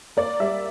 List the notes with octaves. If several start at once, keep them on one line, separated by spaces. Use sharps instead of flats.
A#3 D5
G3 E5